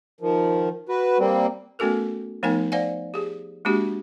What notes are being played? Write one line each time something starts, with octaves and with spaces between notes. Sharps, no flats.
D#3 F3
F#4 B4
G3 A#3 C4
A3 B3 C#4 F#4 A4 A#4
F3 A3 B3 D#4 A#4 G#5
C5 D5 F5 F#5 G#5
G4 G#4
G#3 A#3 C4 D4 F#4 G4